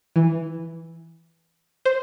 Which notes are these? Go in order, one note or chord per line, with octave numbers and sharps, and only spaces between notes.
E3
C5